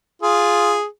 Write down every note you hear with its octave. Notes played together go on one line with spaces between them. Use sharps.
F4 G#4